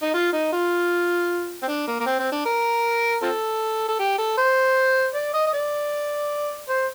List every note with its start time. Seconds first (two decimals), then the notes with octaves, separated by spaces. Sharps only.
0.02 D#4
0.14 F4
0.33 D#4
0.53 F4
1.62 C4
1.67 D4
1.87 A#3
2.00 A#3
2.06 C4
2.19 C4
2.32 D4
2.46 A#4
3.22 C4 F4 A4
3.88 A4
3.99 G4
4.18 A4
4.38 C5
5.15 D5
5.34 D#5
5.47 D#5
5.53 D5
6.69 C5